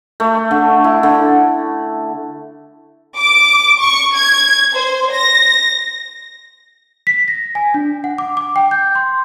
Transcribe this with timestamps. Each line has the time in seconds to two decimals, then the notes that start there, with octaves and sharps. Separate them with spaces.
0.20 A3
0.51 D3
0.84 E4
1.03 D3
3.18 D6
3.81 C#6
4.17 G#6
4.75 C5
5.12 A#6
7.07 B6
7.28 A#6
7.55 G#5
7.74 D4
8.04 F#5
8.18 D6
8.37 D6
8.56 G5
8.71 G6
8.95 C6